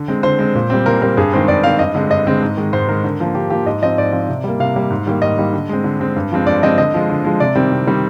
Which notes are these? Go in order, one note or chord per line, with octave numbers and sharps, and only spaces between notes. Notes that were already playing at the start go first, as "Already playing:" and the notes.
Already playing: D3
G#3 C4
D3 C5
G#3 C4
A#2
G3 C4
A#2 A#4
G3 C4 A#4
G2 G#4
D#3 G#3 C4 C5
G2 D5
D#3 G#3 C4 F5
G2 D#5
D3 G#3 C4
G2 D#5
D3 G#3 C4
G#2
D#3 G#3
G#2 C5
D#3 G#3 A#4
D3
F3 A#3
D3 G4
F3 A#3 G4
G#2 D#5
F3 C4 D#5
G#2 D5
F3 C4
C3
G3 A#3
C3 F5
G3 A#3
G#2
D#3 G3 A#3
G#2 D#5
D#3 G3 A#3
D3
G#3 C4
D3
G#3 C4
G2
F3 G#3 C4
G2 D5
F3 G#3 C4 D#5
D3 D#5
F3 G#3
D3
F3 G#3
C3 D5
D#3 G3 C4
C3
D#3 G3 C4